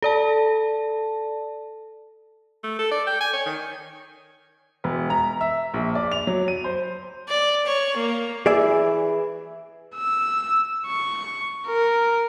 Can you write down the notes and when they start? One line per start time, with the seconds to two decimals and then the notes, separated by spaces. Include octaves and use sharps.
0.02 A4 D5 A5
2.64 A3
2.79 A4
2.91 D5
3.07 G5
3.20 G#5
3.33 C#5
3.46 D#3
4.84 E1
5.10 A#5
5.41 E5
5.74 A#1
5.95 D5
6.12 F7
6.27 F#3
6.48 D#7
6.64 C5
7.28 D5
7.66 C#5
7.96 A#3
8.46 E3 G#4 D5 E5
9.96 E6
10.87 C#6
11.66 A#4